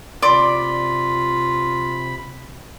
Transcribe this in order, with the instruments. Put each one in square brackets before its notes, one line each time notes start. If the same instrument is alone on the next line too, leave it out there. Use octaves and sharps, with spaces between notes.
[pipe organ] C3 B5 [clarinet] F4 [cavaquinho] D5 C6 D6